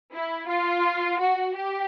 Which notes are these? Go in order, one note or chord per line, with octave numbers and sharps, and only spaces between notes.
E4
F4
F#4
G4